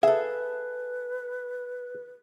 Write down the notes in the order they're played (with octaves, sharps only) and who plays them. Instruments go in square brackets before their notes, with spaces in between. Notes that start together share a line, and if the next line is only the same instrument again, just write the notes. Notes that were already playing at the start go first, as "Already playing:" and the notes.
[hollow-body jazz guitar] G#4 A4 [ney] B4 [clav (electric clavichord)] E5